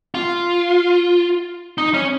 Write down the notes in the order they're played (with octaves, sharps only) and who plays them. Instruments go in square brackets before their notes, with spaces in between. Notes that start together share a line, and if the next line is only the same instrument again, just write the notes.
[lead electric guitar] F4
D#4
C#4